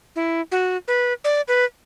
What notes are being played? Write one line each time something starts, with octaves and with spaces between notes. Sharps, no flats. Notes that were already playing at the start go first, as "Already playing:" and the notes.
E4
F#4
B4
D5
B4